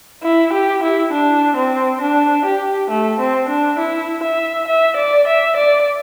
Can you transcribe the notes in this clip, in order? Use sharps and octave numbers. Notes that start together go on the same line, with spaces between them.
E4
G4
E4
D4
C4
D4
G4
A3
C4
D4
E4
E5
E5
D5
E5
D5